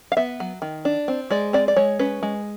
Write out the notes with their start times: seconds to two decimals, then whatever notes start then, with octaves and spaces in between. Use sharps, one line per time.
0.12 F5
0.17 B3 E5
0.40 F#3
0.62 D#3
0.85 D4
1.08 C4
1.30 G#3 D5
1.53 C4 D5
1.68 D5
1.76 G#3 C#5
1.99 C#4 B4
2.23 G#3